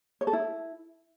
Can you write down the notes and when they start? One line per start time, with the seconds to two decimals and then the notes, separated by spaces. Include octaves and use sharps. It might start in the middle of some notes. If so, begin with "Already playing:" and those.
0.21 C#5
0.27 A4
0.33 E4